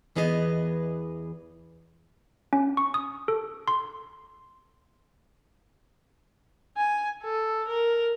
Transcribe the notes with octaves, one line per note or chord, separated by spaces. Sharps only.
E2 E3 B3 G#4 C#5 D#5
C#4
C#6
D#6
A4
C6
G#5
A4
A#4